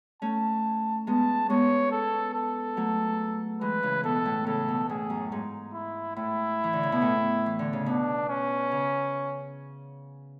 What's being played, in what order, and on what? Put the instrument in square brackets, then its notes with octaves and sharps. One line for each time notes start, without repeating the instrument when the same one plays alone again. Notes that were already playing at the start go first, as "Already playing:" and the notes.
[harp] A3 C#4 [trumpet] A5
[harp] G#3 B3 [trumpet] A5
[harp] G#3 B3 [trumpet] C#5
[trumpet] A4
A4
[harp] F#3 A3
[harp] E3 G#3 [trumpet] B4
[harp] C#3 E3
[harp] B2 [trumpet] A4
[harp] A2
[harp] C#3 [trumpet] A4
[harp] B2
[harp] A2 [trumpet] G#4
[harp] F#2
G#2
[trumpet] E4
[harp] A2 [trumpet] E4
[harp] E3
D3
C#3
B2
A2
E3
D3
C#3
[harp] B2 [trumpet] D4
[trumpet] C#4
[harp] C#3